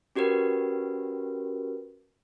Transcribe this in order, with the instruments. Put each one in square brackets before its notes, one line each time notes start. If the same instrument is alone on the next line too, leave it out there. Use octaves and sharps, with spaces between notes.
[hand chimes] C#4 F#4 G4 A#4 B4